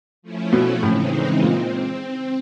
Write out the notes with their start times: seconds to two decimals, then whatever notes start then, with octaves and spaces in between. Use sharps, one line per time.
0.22 F3 A3 C#4 E4
0.52 B2
0.82 A2 C#3 E3 G#3 C4 D#4
1.42 A#2 C4